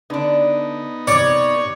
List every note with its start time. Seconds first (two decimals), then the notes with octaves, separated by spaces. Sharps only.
0.10 D3 B3 D4 D#4
1.07 C3 C#5 D5